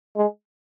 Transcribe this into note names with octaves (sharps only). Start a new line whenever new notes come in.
G#3